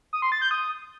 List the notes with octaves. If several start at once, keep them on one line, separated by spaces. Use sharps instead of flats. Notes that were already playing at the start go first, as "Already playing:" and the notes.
D#6
C6
A6
G6
D#6